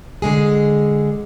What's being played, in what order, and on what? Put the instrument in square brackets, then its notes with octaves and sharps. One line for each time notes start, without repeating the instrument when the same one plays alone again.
[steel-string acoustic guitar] D3 G#3 G#4